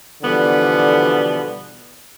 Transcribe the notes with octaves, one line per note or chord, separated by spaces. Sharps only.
B2 D3 E3 F3 G3 B3